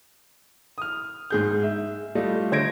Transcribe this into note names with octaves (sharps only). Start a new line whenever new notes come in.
D#6 F6
G#2 G#4 G6
E5
G3 A3 F4 D#5
D3 C5 G#6 A#6 D7